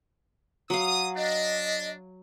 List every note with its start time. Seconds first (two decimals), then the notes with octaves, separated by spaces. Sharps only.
0.70 F#3 F5 D#6
1.17 D4 D#5